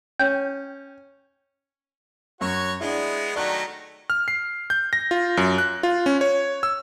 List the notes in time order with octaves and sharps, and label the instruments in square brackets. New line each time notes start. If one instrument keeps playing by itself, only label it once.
[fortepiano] C#4 [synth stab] G5
[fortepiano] F#2 [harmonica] F#4 C#5
[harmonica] G#3 B3 [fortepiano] D4 E4
[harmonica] D#3 F#3 A3 [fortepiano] D5 F#6
[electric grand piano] F6
C7
G6
A#6
F4
F#2
F#6
F4
C#4
C#5
E6